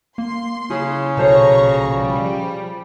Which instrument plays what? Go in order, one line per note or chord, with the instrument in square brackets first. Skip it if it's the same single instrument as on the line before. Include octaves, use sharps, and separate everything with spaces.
[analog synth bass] A#3 [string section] C6
[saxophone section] C#3 [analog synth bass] E4 [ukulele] G#4
[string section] A#1 A#5 C#6 [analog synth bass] B2 [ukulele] A4 C5 C#5
[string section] F3 G3